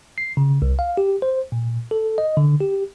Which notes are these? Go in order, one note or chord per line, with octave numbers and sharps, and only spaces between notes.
C7
C#3
C2
F5
G4
C5
A#2
A4
D#5
D3
G4